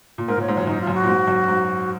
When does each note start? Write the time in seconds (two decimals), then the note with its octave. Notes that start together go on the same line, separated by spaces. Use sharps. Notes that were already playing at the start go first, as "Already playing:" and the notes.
0.18 A#2
0.28 G#2 A#4
0.37 A#2
0.41 C#5
0.48 G#2
0.54 F#2 C#5
0.67 F#2 D#4
0.81 F4
0.87 F#2
0.94 F#4
1.03 A#2
1.07 G#2
1.27 F#2
1.48 G#2